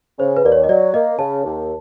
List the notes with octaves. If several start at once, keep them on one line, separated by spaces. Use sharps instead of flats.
C#3 C5
B4
D#2 D5
C#5
D#5
F#3 D5
A#3 D#5
C#3 A5
D#2